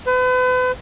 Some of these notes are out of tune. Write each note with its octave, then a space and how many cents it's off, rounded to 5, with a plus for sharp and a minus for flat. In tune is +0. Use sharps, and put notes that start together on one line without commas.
B4 +40